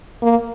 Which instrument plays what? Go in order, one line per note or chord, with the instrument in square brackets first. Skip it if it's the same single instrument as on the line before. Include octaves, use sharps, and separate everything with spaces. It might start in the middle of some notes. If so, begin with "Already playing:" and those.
[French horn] A#3